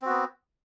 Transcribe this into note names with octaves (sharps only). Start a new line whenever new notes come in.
B3 C4 F#4